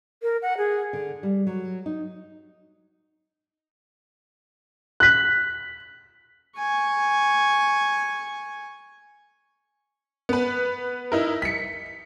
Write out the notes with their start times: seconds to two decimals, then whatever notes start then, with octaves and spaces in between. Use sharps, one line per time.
0.22 A#4
0.42 F#5
0.58 G#4
0.93 D3
1.23 G3
1.47 F#3
1.86 D#4
5.00 F#6 B6
6.58 G#5 C#6
10.29 B3 B4
11.12 D#4 E4 A#4
11.42 B6 C#7